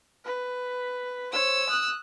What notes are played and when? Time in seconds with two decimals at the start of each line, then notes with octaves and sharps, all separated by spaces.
0.25 B4
1.33 C5 C#5 E6
1.69 D#6 F#6